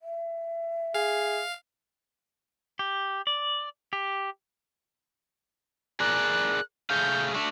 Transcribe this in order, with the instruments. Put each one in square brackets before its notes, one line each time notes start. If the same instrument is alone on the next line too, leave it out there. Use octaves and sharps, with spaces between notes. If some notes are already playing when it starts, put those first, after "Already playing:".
[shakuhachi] E5
[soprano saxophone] G#4 [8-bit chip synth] F5
[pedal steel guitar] G4
D5
G4
[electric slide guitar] G#4 A#4 D5 [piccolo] F#6
[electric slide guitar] A3 G#4 F5 [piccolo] G6
[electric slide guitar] A3 D4